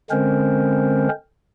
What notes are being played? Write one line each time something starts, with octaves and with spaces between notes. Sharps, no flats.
D3 G#3 C4 C#4 A#4 C5